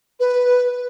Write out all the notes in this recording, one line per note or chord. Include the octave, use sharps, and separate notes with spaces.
B4